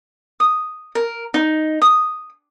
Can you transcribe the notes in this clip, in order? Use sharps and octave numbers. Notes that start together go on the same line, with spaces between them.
D#6
A#4
D#4
D#6